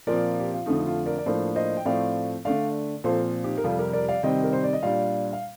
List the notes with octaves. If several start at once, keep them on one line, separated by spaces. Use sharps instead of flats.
A#2 F3 C4 A#4 D5
G4
F4
F2 D3 F3 A3 D#4
F4
A#4 D5
D5
A2 F3 A#3 D4 A4 C5
C5 D#5
G5
A2 F3 A3 C4 D5 F5
D3 A3 D4 D5 F5
A#2 F3 C4 A4 C5
D#4 G4
A#4
F2 C3 G3 F4 A4
G4 A#4
A#4 D5
D5 F5
C3 D#3 G3 C4 D#5 G5
A#4
C5
D5
D#5
A#2 G3 D4 D5 F5
F5